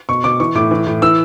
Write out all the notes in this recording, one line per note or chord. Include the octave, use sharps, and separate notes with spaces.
B2 C#6
B2 D6
E3 C#6
A2 D6
E3
A2
E3 E6